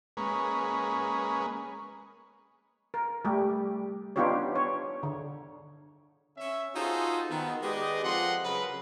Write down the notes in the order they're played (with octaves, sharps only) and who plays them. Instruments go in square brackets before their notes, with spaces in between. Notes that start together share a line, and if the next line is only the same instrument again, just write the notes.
[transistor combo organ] G#3 A#3 C#4 B4
[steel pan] A#4
G3 A3 G4
B3 D4 D#4 F4 G4 C#5
C#5
D3
[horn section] C#4 E5
D#4 F4 F#4 G#4 A4 C5
D#3 B3
G#3 G4 B4 D5 D#5
F3 C4 A4 D#5 F#5 C6
C#3 F#3 G#4 A#4 B4